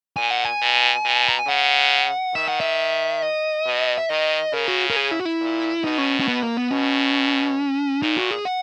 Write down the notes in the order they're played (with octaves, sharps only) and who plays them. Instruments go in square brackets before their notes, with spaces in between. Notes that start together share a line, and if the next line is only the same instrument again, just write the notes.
[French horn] A#2 [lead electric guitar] G#5
[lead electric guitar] F#5
G#5
[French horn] B2
B2
[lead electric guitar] A#5
G#5
[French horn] C#3 [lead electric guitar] F#5
[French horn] D#3 [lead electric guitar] E5
[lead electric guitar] F#5
E5
D#5
[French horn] B2
[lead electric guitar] E5
[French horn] D#3 [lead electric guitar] D#5
[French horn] C#3 [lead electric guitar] A#4
[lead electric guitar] F#4
A#4
G#4
E4
F#4
E4
[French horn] A#2
[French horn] B2 [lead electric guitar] D#4
[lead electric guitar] C#4
C#4
B3
A#3
B3
[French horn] B2 [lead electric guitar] C#4
[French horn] A#2 [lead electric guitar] D#4
[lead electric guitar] F#4
G#4
F#5